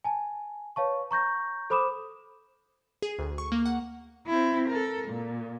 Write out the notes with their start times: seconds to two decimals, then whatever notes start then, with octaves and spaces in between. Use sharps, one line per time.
0.04 G#5 A5
0.76 B4 C#5 F5 A5 C#6
1.11 A#5 C#6 G6 A#6
1.70 A4 C5 B5 D6 D#6 E7
3.02 G#4
3.19 D2
3.38 C#6
3.52 A#3
3.65 F#5
4.27 C4 E4
4.68 A4 A#4
5.08 A#2